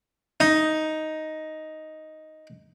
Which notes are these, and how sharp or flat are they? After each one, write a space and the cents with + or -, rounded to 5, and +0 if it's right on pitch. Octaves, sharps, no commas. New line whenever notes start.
D#4 +5